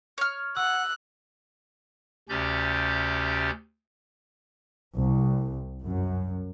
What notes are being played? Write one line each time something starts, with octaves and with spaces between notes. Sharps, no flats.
C#5 F6
F#5 E6 F#6
D2 C3 C#4 G4 D5 G6
C2
F#2